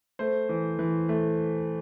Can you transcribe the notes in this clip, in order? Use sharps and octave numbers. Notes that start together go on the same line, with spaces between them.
A3 C5
E3
E3
A3